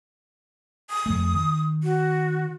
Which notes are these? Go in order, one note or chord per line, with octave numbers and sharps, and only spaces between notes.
D#6
F2 A3
D#3
F#4